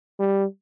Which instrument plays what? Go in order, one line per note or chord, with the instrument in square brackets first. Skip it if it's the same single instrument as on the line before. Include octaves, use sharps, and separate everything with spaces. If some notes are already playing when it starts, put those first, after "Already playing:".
[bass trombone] G3